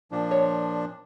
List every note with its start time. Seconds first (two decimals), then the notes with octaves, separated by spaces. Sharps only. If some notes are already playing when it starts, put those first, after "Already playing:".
0.12 A#2 F3 D4
0.31 C#5